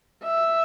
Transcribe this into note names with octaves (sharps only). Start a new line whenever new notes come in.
E5